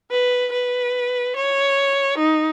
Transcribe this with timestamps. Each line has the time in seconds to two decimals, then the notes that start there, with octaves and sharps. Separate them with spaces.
0.11 B4
0.52 B4
1.36 C#5
2.18 D#4